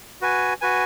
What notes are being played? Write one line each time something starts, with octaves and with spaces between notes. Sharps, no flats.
F#4 B4 G#5
F#4 B4 G#5